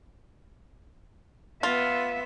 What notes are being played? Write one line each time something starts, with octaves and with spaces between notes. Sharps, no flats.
B3 F4 E5